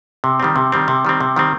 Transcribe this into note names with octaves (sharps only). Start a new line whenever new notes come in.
C3
D#3 G3 C4
C3
D#3 G3 C4
C3
D#3 G3 C4
C3
D#3 G3 C4